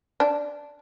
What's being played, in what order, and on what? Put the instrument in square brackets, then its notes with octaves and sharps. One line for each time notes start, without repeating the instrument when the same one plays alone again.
[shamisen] D4